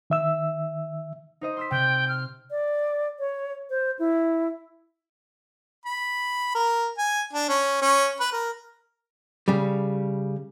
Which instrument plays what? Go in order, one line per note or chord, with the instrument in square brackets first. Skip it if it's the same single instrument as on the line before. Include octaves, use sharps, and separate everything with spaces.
[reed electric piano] D#3 E5 E6
[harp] D#4 C5 D#5
C6 E6 B6
[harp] C3 [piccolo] G5
[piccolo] F6
[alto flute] D5
C#5
C5
E4
[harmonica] B5
A#4
G#5
D4
C#4
C#4
B4
A#4
[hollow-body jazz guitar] C#3 G3